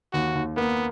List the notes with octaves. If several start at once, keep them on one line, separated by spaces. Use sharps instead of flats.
D#2 F#4
D#2
A#3 B3